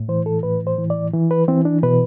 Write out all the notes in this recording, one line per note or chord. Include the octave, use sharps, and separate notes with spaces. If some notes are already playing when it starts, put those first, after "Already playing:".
Already playing: A2
E3 C5
A4
A2 B4
C5
E3
D5
E3
B4
E3 C4
D4
B2 B4